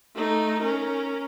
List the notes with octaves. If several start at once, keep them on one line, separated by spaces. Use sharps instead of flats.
A3 D#4
C#4 A#4